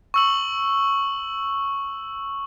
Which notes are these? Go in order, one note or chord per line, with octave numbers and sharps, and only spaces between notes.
C#6 E6 F#7